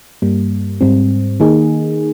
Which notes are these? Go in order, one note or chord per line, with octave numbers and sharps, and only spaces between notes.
G2 G3 A#3
G#2 G3 C4
D#3 A#3 D#4 G#4